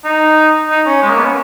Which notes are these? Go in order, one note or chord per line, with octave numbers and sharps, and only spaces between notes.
D#4
D#4
C#4
G#3
A#3
B3
C#4